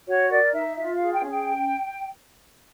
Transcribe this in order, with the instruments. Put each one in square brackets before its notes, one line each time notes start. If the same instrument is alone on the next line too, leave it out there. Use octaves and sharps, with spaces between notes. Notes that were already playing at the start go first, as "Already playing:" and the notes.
[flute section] F#4 C#5
A#4 D5
D#4 E5
F4 E5
F5
G#4
G5
C#4
G5